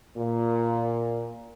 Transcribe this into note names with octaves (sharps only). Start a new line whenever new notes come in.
A#2